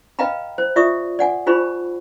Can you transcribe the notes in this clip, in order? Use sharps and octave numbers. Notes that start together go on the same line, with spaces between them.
B4 D#5 F5 G5 A#5 B5
C5
F4 D5 E5 C#6 D#6
D5 F#5 G#5
D#4 F4 G#4 C5 B5 C#6